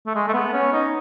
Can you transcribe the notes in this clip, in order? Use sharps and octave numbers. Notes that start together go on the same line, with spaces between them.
A3
G#3
A3
B3
C#4
D#4